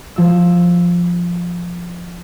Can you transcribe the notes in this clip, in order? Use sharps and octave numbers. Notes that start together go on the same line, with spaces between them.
F3 E6